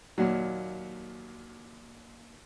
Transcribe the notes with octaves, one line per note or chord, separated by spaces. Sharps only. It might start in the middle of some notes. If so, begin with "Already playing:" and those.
D#2 A#2 F#3